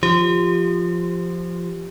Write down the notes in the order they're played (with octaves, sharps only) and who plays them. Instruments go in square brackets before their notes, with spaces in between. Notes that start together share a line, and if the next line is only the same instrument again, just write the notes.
[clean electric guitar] F3 [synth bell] G4